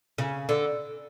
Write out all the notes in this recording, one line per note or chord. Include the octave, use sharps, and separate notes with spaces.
C#3
D3